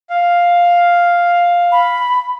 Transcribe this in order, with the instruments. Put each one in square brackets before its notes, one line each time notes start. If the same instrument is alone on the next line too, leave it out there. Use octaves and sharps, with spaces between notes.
[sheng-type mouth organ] F5
[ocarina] B5